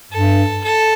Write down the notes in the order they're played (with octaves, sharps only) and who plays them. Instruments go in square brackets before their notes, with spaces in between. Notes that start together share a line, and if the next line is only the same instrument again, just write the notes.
[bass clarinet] G2 [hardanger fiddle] A4
[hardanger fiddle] A4